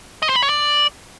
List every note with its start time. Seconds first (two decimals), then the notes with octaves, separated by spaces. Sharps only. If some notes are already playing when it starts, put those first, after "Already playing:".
0.22 D#5
0.29 C5
0.36 B5
0.43 C#5
0.49 D5